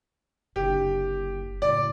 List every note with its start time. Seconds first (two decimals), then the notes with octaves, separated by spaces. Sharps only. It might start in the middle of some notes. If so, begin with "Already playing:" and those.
0.56 F#1 D3 G4
1.62 F#1 A2 D5